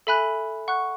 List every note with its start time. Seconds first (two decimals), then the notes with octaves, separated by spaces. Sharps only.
0.07 A4 E5 G#5 B5 F#6
0.68 F#5 C#6 F#6